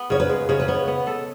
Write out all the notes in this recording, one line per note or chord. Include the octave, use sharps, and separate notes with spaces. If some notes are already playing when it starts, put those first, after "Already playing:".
Already playing: B3
C#3 C#5
B4
G#3
C#3 C#5
B4
B3 C#5
B3
A4